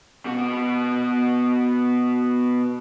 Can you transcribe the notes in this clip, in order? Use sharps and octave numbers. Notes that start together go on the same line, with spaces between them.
B2 F#4